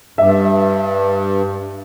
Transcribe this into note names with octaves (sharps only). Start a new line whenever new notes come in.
G2 E5